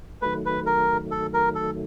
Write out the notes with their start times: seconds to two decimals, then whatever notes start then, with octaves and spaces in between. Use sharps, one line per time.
0.22 D#3 F#3 A3 B4
0.46 B4
0.66 A#4
1.11 A4
1.33 A#4
1.55 A4